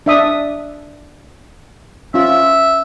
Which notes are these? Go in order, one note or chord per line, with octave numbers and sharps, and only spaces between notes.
D4 E5 D#6
C#4 F4 E5